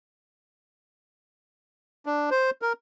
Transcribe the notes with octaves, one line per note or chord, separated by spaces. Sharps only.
D4
C5
A#4